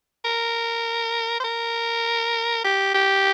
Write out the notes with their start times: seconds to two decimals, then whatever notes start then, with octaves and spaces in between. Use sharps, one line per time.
0.25 A#4
1.40 C5
1.44 A#4
2.64 G4
2.94 G4